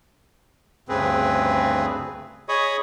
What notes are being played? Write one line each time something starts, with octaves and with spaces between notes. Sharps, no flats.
D2 G2 C#3 C4 G#4 B4
G#4 C#5 D#5 B5 C#6 D#6